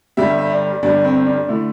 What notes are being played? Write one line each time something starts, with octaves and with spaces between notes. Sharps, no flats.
G1 G2 G3 E5
E5
D5
G1 G2 G3 D4
C4
D4
D3 A3 E4